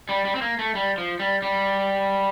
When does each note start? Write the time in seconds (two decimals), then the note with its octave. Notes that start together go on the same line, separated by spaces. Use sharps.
0.09 G3
0.25 G3
0.35 C4
0.42 A#3
0.59 A3
0.75 G3
0.98 F3
1.20 G3
1.42 G3